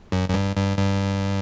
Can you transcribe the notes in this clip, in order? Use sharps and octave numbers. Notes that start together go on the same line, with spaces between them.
F#2
F#2
G2
G2
G2